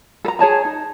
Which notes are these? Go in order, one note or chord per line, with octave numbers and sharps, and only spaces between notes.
A4 A#5
G#4 C#5 A5 A#5
D#4